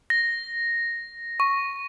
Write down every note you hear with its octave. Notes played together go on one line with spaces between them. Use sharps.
A#6
C#6